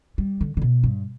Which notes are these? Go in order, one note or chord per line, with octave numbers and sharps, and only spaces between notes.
G3
D3
D3
B2
G2